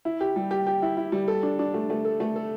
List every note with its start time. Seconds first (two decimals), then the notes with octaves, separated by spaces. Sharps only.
0.05 E4
0.21 G4
0.36 G3
0.51 G4
0.67 G4
0.82 E4
0.97 E4
1.12 G3
1.28 A4
1.43 D4
1.59 D4
1.74 A3
1.90 A3
2.05 A4
2.20 A3
2.36 A4